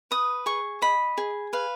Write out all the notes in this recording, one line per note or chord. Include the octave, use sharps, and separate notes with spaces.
B4 D#6
G#4 C#6
D#5 B5
G#4
B4 F5